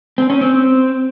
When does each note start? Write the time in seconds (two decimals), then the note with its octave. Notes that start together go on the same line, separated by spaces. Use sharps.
0.18 C4
0.30 C#4
0.41 C4